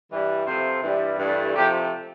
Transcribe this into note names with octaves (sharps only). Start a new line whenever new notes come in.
G2 E3 G3
C3 F3 A3 C5
G2 E3 G3
G2 E3 A3
C3 F3 A3 G4